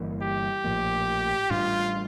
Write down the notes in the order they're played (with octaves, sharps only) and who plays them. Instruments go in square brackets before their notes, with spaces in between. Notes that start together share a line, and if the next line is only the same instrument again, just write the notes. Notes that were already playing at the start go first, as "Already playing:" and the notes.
Already playing: [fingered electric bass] G1 G2 E3 A#3
[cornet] G4
[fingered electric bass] A#1 A2 F3 A#3
[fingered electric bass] A1 A2 G3 D4 [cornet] F4